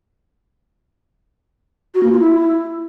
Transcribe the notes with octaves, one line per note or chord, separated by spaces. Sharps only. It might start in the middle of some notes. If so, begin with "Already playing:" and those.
F#4
A#3
F4
E4